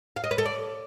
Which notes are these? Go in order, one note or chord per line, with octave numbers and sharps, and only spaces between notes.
F5
D#5
B4
A4
D5